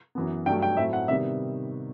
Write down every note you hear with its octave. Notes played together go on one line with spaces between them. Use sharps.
F#2 E3 B3
G2 F#3 A3 G5
G5
A2 F#3 A3 C4 E4 E5
F#5
C3 D#3 G3 B3 E5